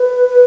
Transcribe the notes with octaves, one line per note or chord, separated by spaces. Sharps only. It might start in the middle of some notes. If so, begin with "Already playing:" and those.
Already playing: B4
B4